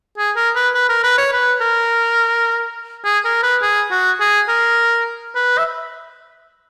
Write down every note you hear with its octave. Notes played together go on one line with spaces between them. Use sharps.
G#4
A#4
B4
B4
A#4
B4
C#5
B4
A#4
G#4
A#4
B4
G#4
F#4
G#4
A#4
B4
E5